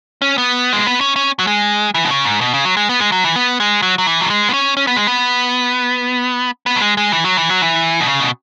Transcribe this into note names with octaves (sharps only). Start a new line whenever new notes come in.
C#4
B3
G#3
B3
C#4
C#4
F#3
G#3
E3
B2
C#3
G#2
B2
C#3
F#3
G#3
B3
G#3
F#3
E3
B3
G#3
F#3
F#3
E3
F#3
G#3
B3
C#4
C#4
B3
G#3
B3
B3
F#3
G#3
G#3
E3
F#3
E3
F#3
E3
B2
C#3
B2